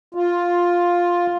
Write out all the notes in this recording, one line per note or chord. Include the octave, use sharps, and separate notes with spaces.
F4